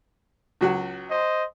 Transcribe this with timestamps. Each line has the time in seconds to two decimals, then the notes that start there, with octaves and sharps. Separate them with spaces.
0.61 C#2 F#3 F#4
1.10 C5 D#5